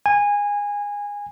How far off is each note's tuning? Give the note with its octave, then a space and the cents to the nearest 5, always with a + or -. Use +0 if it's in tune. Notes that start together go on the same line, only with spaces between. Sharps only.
G#5 -20